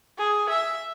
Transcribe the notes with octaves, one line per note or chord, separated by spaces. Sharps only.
G#4
E5